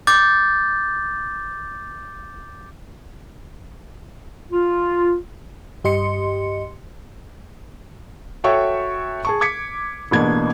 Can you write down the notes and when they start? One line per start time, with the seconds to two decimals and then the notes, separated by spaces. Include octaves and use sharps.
0.07 D6 G6 A6
4.52 F4
5.84 G2 G4 D#5 C6 C#7
8.44 F#4 A4 C#5 E5 G5 C#6
9.25 G#4 A5 C#6
9.41 D6 G#6 B6 C#7
10.11 A1 E2 B2 A#3 D4 G#6